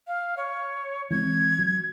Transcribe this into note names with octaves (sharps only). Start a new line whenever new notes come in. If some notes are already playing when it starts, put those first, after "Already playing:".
F5
C#5
E3 G#3 C4 G#6
F#3